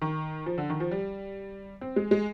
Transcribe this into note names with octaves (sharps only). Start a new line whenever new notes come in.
D#3
F3
D3
D#3
F3
G3
C4
G#3
G#3